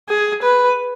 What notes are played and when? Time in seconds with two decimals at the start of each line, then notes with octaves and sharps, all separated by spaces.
0.09 G#4
0.43 B4